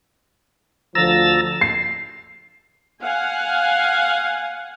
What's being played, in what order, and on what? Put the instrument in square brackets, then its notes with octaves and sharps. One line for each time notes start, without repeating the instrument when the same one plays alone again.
[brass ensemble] D2 D3 F3 [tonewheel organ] A#5 E6 A6
[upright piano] C7
[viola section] F5 F#5 G#5